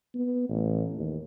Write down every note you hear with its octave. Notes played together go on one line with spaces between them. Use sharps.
B3
A1
D#2